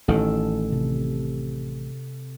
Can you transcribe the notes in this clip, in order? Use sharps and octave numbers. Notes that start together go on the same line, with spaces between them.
A1 D#3 A4
C3